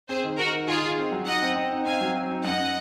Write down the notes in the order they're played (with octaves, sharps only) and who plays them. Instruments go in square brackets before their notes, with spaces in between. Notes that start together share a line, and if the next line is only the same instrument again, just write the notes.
[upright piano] C4 [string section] G#4 C5
[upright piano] D#3
[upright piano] D#3 [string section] F#4 A#4
[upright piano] D#3
[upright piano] D#3 [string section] F4 G#4
[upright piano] D#3
C4
F#3
[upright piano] D#4 [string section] D#5 F#5
[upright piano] C4
C4
D#4
[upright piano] C4 [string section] F5 G#5
[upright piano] F#3
C4
D#4
[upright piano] F#2 [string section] D#5 F#5